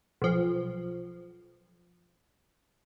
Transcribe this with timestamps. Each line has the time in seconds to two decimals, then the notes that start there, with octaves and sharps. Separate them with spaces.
0.22 B1 F3